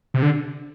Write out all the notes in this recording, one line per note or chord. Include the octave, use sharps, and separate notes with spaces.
C3
D3